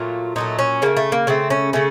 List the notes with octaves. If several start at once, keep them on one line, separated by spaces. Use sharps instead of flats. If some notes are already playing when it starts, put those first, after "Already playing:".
Already playing: A#2 F#3 A3 F4
A#2 F#3 A3 D#4
C#4
C#3 A3 A#3
A3
A#3
C#3 A3 C4
C#4
C#3 A3 C#4